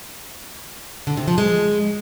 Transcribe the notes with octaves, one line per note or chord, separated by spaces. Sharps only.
D3
C3
F3
G#3